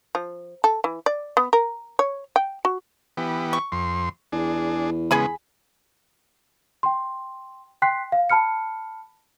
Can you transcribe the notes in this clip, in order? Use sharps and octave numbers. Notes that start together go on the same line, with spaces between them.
F3
A4
E3
D5
B3
A#4
C#5
G5
F#4
E3 B3 G4
C#6
F2 C6
E2 D4 G#4
C#3 G#3 B3 G#4 G#5 B5
G5 C6
G5 C6 F#6 B6 C7
F5
A5 B5 F6 C#7